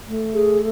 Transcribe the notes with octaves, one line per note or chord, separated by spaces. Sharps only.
A3
G#4